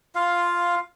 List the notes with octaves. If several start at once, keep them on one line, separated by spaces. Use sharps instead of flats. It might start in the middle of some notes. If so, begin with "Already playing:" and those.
F4 F5